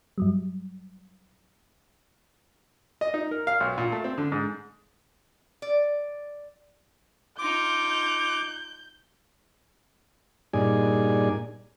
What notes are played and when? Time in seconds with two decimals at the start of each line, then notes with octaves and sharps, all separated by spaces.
0.18 G2 F#3 G3
3.01 D#5
3.14 D#4
3.31 A#4
3.47 F5
3.60 B1
3.78 A#2
3.92 A3
4.04 C4
4.18 D3
4.32 G#2
5.62 D5
7.39 D#4 F4 D6 G6
10.53 G2 A#2 D#4 G#4 D5 G#5